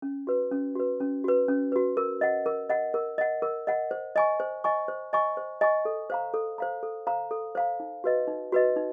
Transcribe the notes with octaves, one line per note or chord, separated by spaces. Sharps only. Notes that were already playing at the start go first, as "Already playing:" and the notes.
C#4
F#4 B4
C#4
F#4 B4
C#4
F#4 B4
C#4
F#4 B4
A#4
D#5 F#5
A#4
D#5 F#5
A#4
D#5 F#5
A#4
D#5 F#5
C5
D#5 G#5 C#6
C5
D#5 G#5 C#6
C5
D#5 G#5 C#6
C5
D#5 G#5 C#6
A4
C5 F5 A#5
A4
C5 F5 A#5
A4
C5 F5 A#5
A4
C5 F5 A#5
D#4
F#4 B4 D#5
D#4
F#4 B4 D#5
D#4